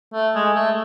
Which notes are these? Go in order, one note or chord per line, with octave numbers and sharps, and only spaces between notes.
A3
G#3
A3